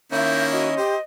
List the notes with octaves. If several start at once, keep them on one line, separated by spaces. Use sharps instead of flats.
D#3 A#3 C#4 E4 E5 G6
F#4 D#5
G4 C5